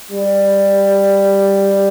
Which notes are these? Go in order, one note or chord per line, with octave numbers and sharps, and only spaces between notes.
G3